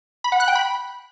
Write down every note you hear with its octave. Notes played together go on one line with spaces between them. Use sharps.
B5
F#5
F#6
G5
B5